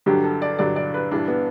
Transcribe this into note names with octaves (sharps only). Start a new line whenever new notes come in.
G2 D3 F#3 G4
A4
D5
G2 D3 F#3 D5
D5
B4
G2 E3 G3 D4
B3